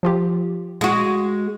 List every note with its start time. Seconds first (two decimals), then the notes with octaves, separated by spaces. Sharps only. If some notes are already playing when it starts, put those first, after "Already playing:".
0.03 F3 F4 G4
0.81 G#3 F#4